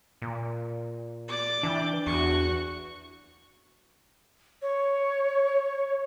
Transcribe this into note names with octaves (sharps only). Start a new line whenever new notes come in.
A#2
D5 D6
E3 D4 G5
E2 F#4 C#6
C#5